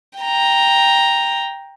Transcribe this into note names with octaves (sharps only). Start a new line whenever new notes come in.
G5 A#5